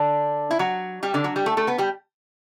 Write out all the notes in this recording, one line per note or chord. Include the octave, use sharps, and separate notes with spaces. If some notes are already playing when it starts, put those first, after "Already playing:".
Already playing: D3 D4
E4
F#3 F#4
G3 G4
D3 D4
F#3 F#4
G3 G4
A3 A4
A3 A4
B3 B4
G3 G4